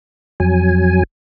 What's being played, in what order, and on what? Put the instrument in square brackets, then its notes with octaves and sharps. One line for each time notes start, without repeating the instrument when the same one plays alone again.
[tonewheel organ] F2 F#3 G#5